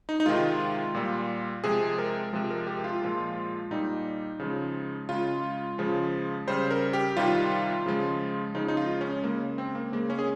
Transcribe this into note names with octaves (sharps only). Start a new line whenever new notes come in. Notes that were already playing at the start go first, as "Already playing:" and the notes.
D#4
D#4
C3 D#3 G#3 F4
A#2 G3
C3 F3 G#3 G#4
A#4
C3 F3 G#3
A#4
G4
F4
A#2 F3 G#3
A#2 G3 D#4
C#3 F3 G#3
C#3 G#3 F4
C#3 F3 G#3
C#3 G3 C5
A#4
G4
C3 D#3 G3 F4
C#3 F3 G#3
C#3 F3 G#3 D#4
D#4
F4
C#4
C#3 G#3 A#3
C4
A#3
C#3 G#3 A#3
C#4
G#4